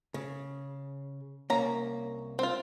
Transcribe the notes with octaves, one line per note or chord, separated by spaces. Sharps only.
C#3
C2 A#3 C#4 A#5
C4 F4